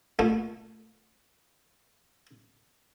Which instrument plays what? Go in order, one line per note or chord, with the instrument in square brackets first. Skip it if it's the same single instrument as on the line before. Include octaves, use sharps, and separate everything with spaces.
[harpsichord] A#2 A3